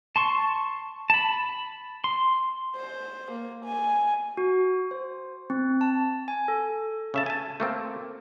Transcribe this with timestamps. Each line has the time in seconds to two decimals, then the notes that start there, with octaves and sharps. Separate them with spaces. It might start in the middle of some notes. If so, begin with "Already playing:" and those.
0.16 A5 C6 C#6
1.10 A5 B5
2.04 C6
2.76 C5
3.31 A#3
3.64 G#5
4.37 F#4
4.91 C5
5.50 C4
5.81 A5
6.28 G#5
6.48 A4
7.14 C#3 E5 A5
7.26 G#5 A5
7.60 A3 A#3 C4